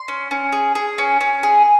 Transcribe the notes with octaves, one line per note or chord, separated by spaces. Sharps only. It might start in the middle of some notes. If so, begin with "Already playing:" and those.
Already playing: C6
C#4
C#4
G#4
G#4
C#4
C#4
G#4